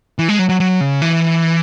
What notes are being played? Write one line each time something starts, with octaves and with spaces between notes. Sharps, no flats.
E3
G#3
F#3
F#3
F#3
C#3
E3